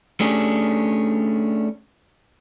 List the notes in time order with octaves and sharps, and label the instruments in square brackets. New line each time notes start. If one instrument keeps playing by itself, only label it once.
[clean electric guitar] A3 C#4 D4 G4 G#4